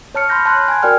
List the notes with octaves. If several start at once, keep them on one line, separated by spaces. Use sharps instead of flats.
C#5 A5 F6 C#7
B5 C6 F6 G6 A#6
A5 B5 C6 F#6
G#5 G#6
F#4 A#4 D5 G5 F6